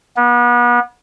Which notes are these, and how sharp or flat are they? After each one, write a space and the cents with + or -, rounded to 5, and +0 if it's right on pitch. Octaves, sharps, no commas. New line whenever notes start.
B3 -35